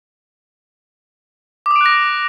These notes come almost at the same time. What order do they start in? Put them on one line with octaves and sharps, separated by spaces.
D6 D#6 D7 F#6 A#6